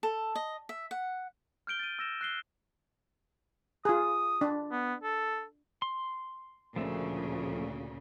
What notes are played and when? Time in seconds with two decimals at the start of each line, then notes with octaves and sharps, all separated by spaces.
0.03 A4
0.35 D#5
0.69 E5
0.91 F#5
1.67 F6 G6 D7 G7
1.79 A6 D#7
1.99 E6 A#6 E7
2.21 F#6 C7 G7
3.85 F4 G#4 D#6
4.41 D4
4.72 B3
5.03 A4
5.82 C6
6.76 D2 A#2 C#3 F3 A3